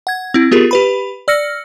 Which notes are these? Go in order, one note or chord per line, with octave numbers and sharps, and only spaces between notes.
F#5 G#6
C4 E4
B3 F4 G4 G#4 A#4
G4 B4 B5
D5 E6 F6 A#6 C#7